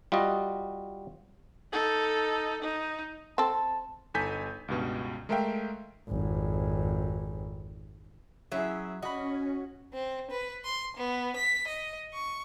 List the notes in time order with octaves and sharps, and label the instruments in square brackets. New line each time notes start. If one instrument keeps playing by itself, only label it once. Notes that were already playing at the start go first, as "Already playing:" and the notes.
[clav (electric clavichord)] G3 F4 F#4 D#5
[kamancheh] D#4 A4
D#4
[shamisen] C4 A4 [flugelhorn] A5
[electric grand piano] G1 D#4 A4 G#5 G6 B6
C#2 G2 B2
G#3 A3 A#4 E5 F5 G5
[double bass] G#1 F2
[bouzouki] F#3 E5 [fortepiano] C#4 E4 G#4
[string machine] C#4 [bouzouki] F#4 [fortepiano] D#5 B5
[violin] C4
B4
C6
B3
B6
D#5
C#6